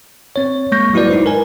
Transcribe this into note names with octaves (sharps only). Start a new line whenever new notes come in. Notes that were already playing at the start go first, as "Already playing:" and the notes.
C4 C#5
G#3 A#3 C#6 G6 A#6
F#3 G#3 E4 F#4 B4 D5
D#4 E4 C5
A#4 B4 G#5